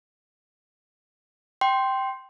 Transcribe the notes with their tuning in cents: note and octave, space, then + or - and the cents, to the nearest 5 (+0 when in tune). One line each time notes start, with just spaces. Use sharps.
G5 -10 C6 +0